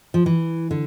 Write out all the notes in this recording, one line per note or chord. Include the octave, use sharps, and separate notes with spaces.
F3
E3
D3